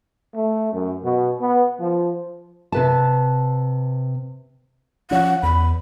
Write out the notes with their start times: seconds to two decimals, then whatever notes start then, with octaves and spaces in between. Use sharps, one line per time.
0.35 A3
0.73 F#2
1.03 B2
1.39 B3
1.79 F3
2.72 C3 B4 A5
5.11 F3 C#4 F#5
5.43 E2 B5